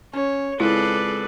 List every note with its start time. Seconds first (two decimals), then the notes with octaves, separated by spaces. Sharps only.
0.13 C#4 C#5
0.60 C#2 C4 E4 G#4 A4 B4 D5